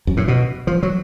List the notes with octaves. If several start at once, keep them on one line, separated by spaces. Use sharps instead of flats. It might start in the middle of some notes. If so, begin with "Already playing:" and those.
F#2
A2
B2
F3
F#3